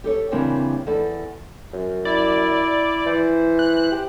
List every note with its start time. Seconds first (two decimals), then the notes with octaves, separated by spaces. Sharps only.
0.04 G4 A4 C#5
0.31 C#3 E3 G3 A#3 C4 D4
0.87 E2 A4 D5
1.73 F#2
2.05 E4 D5
3.06 E3 C5
3.59 F#6
3.92 G4